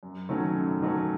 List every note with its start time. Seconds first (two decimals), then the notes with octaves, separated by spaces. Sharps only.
0.03 F#2
0.29 D#3 F#3 A3 C#4
0.56 F#2
0.81 D#3 F#3 A3 C#4